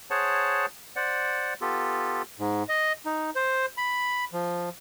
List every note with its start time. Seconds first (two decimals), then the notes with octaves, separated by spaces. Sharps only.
0.10 G#4 C5 C#5 F#5 A5
0.96 C5 D5 F#5
1.61 B3 F4 G4 A4
2.39 G#2
2.69 D#5
3.06 D#4
3.35 C5
3.77 B5
4.33 F3